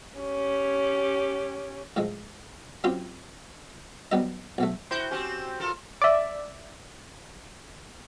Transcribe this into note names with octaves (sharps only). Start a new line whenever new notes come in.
C#4 G4
A2 F3 G#3
F#3 C4 C#4 F4 G4 C6
F#3 G3 B3 D#4 D#5
B1 F#3 A3
E4 F#4 C5 G5 G6
C4 C#4 F#4 G4 G#5
F4 A4 A#4
D5 E5